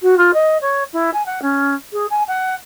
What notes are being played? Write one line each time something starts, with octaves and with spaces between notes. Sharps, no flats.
F#4
F4
D#5
C#5
E4
G#5
F#5
C#4
G#4
G#5
F#5